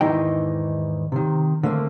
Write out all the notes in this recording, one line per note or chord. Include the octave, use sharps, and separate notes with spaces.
E2 G#2 D#3 E3 D#4 G5
C3 D#3
D3 A3 A#3 C4